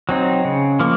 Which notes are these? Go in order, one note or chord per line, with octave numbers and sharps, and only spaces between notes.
F#3 C4 D#4
C#3
F3 A#3